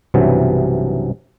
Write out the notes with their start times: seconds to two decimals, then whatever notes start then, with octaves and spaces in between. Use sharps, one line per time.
0.14 B1 G2 C3 E3 F#3